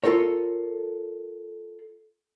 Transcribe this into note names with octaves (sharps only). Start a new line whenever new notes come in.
F4 A4 A#4 C#5